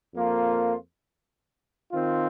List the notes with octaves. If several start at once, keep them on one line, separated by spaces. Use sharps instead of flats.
F2 F3 A#3 F4
D#3 C4 F4